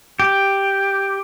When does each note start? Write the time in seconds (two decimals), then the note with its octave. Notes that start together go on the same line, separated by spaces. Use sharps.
0.20 G4